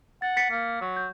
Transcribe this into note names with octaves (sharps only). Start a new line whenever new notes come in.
F#5 A6
A6 B6 C#7
A#3
F#3
G6